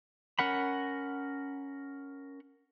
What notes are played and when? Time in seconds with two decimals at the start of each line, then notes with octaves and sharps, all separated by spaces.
0.39 C#4 A#4 F#5 B5